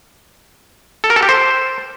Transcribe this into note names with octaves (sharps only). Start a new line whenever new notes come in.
A4
A#4
A4
G4
C5